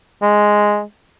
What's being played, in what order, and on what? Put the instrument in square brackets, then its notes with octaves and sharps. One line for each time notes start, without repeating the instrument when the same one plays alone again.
[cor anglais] G#3